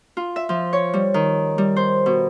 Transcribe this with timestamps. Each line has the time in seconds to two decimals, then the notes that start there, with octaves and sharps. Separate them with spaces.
0.17 F4
0.36 E5
0.49 F3
0.73 C#5
0.94 G3
1.14 D#3
1.58 G3
1.76 C5
2.06 B2